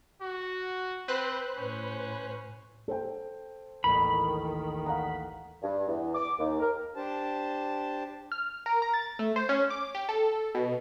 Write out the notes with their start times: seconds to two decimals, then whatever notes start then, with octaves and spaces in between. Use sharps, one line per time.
0.21 F#4
1.08 C4 B4 C5 F#6
1.57 A2 C#4
2.88 A4 C5 G5
3.84 A1 D#2 D#3 B5
4.86 F5 F#5 A#5
5.63 G2
5.87 E2
6.15 D6
6.39 D#2
6.60 A#4
6.96 D4 G4 C5 A5
8.32 F6
8.66 A#4
8.82 A#5
8.94 A6
9.19 A3
9.36 C5
9.49 C#4
9.70 D6
9.95 G4
10.09 A4
10.55 B2